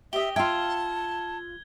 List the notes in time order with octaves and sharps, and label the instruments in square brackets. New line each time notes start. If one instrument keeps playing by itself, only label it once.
[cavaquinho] G4 D#5 [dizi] E5 [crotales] G7
[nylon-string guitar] F4 G5 [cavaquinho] E5 F5 [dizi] A5 [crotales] G#6